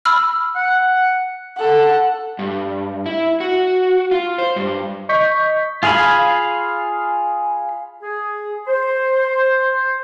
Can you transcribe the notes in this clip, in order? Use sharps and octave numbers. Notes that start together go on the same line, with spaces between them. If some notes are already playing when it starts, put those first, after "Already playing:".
B5 E6 F6
F#5
A4 F#5
G2
E4
F#4
F4
C5
G2
D#5 C#6 G6 B6
F4 G#4 F5 G#5 B5
G#4
C5